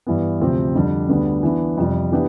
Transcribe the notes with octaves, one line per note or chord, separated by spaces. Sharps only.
G2 E3 B3
D2 C3 F3 C4 G4
F2 D3 G3 D4
D2 D3 G3 B3 D4
E3 B3 D4
F2 C3 G3
E3 B3 D4 G4